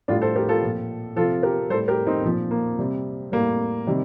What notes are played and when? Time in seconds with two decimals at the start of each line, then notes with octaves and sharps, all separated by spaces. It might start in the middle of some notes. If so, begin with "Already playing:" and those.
0.08 A2 G3 D4 F4
0.22 A4 C5
0.36 G4 A#4
0.48 F4 A4
0.63 A#2 F3
1.16 C3 F3 F4 A4
1.43 G4 A#4
1.70 A2 G3 A4 C5
1.88 G4 A#4
2.07 C4 D#4
2.24 A#2 F3
2.51 A#3
2.79 C3 G3
3.32 A2 G3 A#3
3.87 C3 D#3 G3